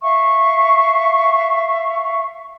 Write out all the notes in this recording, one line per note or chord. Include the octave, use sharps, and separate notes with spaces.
E5 F5 C#6